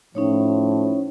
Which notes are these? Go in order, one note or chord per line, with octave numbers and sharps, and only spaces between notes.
A2 F3 C#4 D#4 C#5